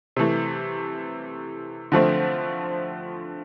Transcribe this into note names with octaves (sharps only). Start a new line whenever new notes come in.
C3 E3 A3
D3 F3 A3 C4